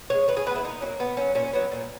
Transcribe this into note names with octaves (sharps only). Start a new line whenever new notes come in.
G#3 B3 C#5
D#3 B4
G#4
G#3 B3 B4
E4
A#2 D#4
F#3 A#3 C#4
A#2 B3
F#3 A#3 C#4
A#2 C#4
F#3 B3
A#2